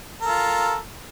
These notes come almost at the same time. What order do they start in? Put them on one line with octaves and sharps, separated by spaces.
A#4 A4 F4